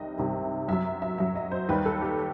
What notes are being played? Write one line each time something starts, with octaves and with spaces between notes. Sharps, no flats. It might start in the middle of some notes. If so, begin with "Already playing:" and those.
Already playing: C2 C3 D#3 G3 D#5
C2 C3 D#3 G3
F#2 F#3 E5
E5
F#2 F#3 E5
D#5
C5
D#2 D#3 G3 B4
A4
G4